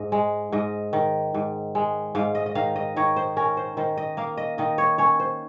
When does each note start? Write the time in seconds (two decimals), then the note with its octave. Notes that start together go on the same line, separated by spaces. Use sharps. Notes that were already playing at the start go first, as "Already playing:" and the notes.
Already playing: G#2 D#5
0.12 G#3
0.52 G#2 D#5
0.93 D#3
1.34 G#2
1.75 G#3
2.15 G#2 F5
2.35 D#5
2.46 D#5
2.55 D#3 F5
2.76 D#5
2.97 D#3 C#5
3.16 C5
3.37 C#4 A#4
3.57 C5
3.77 D#3 C5
3.97 D#5
4.17 A#3 F5
4.37 D#5
4.58 D#3 D#5
4.78 C#5
4.98 C#4 C#5
5.20 C5